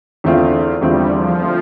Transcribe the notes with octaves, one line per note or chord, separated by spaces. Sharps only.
E2 D3 A3 C4 F4
E2 D3 G3 A3 C4 F4
F3
D3 A3 C4 F4